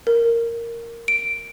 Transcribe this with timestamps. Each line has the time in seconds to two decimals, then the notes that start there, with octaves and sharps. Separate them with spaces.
0.07 A#4
1.08 D7